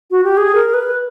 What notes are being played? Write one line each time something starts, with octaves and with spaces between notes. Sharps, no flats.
F#4
G4
G#4
A#4
B4